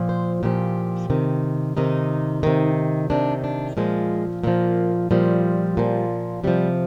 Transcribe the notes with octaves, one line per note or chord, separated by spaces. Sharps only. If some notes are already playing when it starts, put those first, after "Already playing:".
Already playing: A#2 F3
C5
A#2 F3 G4
C3 D#3
C3 D#3 D#4
C3 D#3
C3 D#3 D4
D4
A#2 F3 G#3
A#2 F3 A#3
A#2 F3 G3
A#2 F3
C3 F3 G3